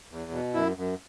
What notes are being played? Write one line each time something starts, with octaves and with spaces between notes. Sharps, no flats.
E2
B2
F#2 E4
F#2